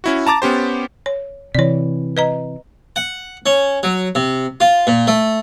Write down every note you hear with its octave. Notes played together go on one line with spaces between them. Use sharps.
C#4 E4 F#4
A5 A#5 D6 A6
B3 C#4 G4 C5
C#5
C3 E3 C#5 D5
B4 D#5 A#5
F#5
C#4
F#3
C3
F4
A#2
A3